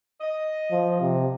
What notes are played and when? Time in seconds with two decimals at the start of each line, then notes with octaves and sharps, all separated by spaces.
0.21 D#5
0.71 F3
1.01 C3